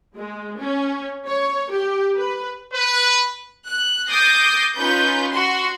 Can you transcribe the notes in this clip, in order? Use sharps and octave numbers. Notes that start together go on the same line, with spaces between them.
G#3
C#4
C#5
G4
B4
B4
F#6
D6 D#6 G6 A6 A#6 C7
C#4 D#4 F4 B4 G6
F#4 C6